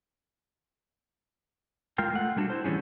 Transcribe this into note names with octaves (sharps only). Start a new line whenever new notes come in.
G#3 F4 A#4 F5 G5
A3 F#5
G3 A3 D4 E4 F#4 A4
E4 C5
E3 G3 B3 C#4 G#4